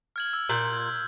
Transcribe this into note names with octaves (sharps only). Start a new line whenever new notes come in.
F6 G#6 F#7
E6
A#2 G6 F#7